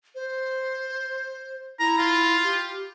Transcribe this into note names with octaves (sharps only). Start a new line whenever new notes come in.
C5
E4 A#5
F4
G4